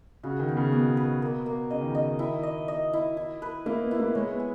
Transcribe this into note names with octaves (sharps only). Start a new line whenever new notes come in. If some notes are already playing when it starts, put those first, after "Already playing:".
C#3 F#4
D#3
B3
C#3
B2 B4
B4
A#3
A#3
C#3 D#5
D#3
C#3 D#5
D#3 E4
D#5
D#5
E4
E4
B4
A#3 E4
B3
E4
A#3
G#3 C#5
B3
G#4